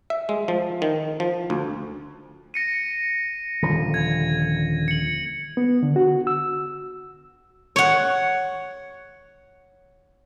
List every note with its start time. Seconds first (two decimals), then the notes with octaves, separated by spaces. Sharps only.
0.10 E5
0.29 G#3
0.48 F3
0.82 D#3
1.20 F3
1.50 D2
2.54 A#6 C#7 D#7
3.62 D#1 D3 F3
3.94 G#6
4.88 C#7 F#7
5.57 B3
5.83 D3
5.96 F#4
6.27 E6
7.76 C#5 F#5